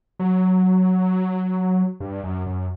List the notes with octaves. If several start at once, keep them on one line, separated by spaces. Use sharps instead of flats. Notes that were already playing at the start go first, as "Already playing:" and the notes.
F#3
G2
F#2
F#2